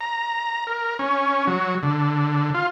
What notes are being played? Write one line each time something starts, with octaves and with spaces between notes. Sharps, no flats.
A#5
A#4
C#4
F#3
D3
F4